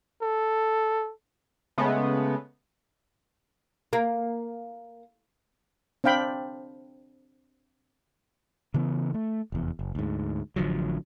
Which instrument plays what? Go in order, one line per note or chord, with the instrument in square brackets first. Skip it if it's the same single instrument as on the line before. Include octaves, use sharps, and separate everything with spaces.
[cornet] A4
[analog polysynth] C#3 G#3 A3 B3
[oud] A#3
[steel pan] C4 D4 F5 G5 B5
[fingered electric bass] C#3 E3 B3
A3
F1 E2
F#1
D2 G#2
A1 D3 F3 F#3